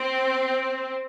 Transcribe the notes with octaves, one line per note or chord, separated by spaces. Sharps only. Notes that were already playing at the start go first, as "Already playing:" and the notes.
Already playing: C4